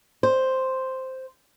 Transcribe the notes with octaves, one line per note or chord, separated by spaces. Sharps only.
C5